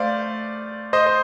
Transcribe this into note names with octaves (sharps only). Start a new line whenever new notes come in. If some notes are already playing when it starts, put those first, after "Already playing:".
Already playing: A3 C5 D5 F5
C5 D#5
C5